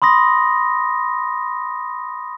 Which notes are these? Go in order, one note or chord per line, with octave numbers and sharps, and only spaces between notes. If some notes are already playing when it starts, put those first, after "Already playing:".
B5 C6 D#6 A#6